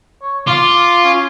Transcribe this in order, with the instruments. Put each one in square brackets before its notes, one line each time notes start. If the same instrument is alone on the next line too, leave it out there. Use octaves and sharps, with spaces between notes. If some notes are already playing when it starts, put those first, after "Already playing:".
[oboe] C#5
[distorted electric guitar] F4 [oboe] D6
[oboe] C#4